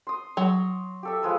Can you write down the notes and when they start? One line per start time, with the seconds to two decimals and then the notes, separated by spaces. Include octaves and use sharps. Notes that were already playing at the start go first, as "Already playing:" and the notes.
0.07 C6 D#6
0.37 F#3
1.03 G4 A4 E5
1.23 F3 G#3 B4